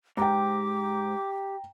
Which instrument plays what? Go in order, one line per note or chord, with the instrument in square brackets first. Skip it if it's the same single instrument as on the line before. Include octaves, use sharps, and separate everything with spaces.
[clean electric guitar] G#2 [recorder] G4 [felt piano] G5 A#5 [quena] D6